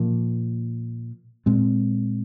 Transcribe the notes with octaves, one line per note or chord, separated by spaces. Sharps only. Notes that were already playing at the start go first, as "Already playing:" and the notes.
Already playing: A#2 F3 A#3
A#2 G#3 C4